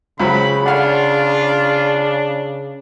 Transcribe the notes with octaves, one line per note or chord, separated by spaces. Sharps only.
C#2 C#3 F#3 C4 B5
D4 F4 C#5 F5 F#5